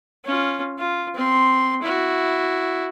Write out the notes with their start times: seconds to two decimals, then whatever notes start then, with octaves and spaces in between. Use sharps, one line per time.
0.25 C#4 F4
0.78 F4
1.14 C4 C6
1.82 E4 F#4